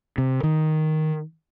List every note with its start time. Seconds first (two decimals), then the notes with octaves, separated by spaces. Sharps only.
0.18 C3
0.43 D#3